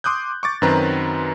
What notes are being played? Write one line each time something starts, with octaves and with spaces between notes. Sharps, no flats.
C6 D6 D#6 F#6 G6
C#6 D6 A6
F#2 D#3 F#3 C4 B4 A#5